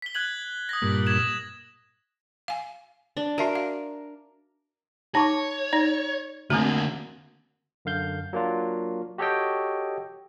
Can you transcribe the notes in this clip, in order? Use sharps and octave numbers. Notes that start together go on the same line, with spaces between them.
B6 G7
F#6 G#6 F#7
D#6 G#6 A#6
G2 A#2
G#6 E7
F5 G#5
D4
F#4 A#4 E5 A5
F5
D#4 C#5 A5 C#6 D6
D#4 D5
D3 A3 A#3 C4 F#4 A#5 D#6
F#2 D3 F5 G6
F#3 A#3 D4 F4
F#4 G4 A4 C#5 D#5 G5